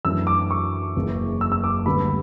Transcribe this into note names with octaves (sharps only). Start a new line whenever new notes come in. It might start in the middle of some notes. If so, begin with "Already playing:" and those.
F#2 E3 A3 D4 E6
D6
C#6
F#1 E2 C#3
E6
E6
D6
D2 D3 G3 B3 D4 B5